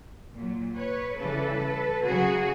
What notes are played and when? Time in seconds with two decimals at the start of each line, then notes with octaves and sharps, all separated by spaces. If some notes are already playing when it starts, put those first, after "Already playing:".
0.34 A#2 F#3
0.76 B4 C#5
1.18 C#3 E3 G3 A4 B4
2.04 C#3 F#3 F#4 G#4